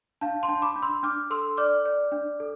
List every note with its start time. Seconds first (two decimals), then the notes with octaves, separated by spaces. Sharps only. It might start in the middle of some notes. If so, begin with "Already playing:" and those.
0.21 D4 F5 A5
0.43 A5 C6
0.49 D4
0.62 B5 D6
0.76 D4
0.82 C6 E6
1.03 D4 D6 F6
1.30 A4 C6 E6
1.57 D5 D6 F6
1.86 D5
2.12 D4
2.40 A4